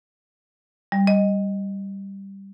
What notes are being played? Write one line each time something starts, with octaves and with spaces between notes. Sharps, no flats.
G3
D#5